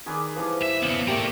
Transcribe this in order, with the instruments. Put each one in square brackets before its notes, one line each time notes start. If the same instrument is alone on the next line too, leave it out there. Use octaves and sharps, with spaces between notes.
[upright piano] D#3 [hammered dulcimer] G#4 B4 D5
[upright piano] E3 B4 [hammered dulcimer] F3 G3
[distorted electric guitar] E5
[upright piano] C#3 [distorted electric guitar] E3 B3
[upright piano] A3 A#3 G4 [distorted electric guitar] A#4 D5